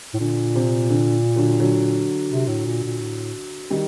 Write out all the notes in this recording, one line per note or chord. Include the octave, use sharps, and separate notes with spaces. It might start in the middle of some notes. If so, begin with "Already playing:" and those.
A2
A#2 D3
C3
D3
D3 F#3
D3 F#3
C3
A2
A#2
A#2
A2
D#3 G3